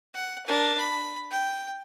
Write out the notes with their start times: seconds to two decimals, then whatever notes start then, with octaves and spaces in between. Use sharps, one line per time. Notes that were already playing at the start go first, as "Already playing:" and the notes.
0.14 F#5
0.46 D4 A#4
0.78 B5
1.31 G5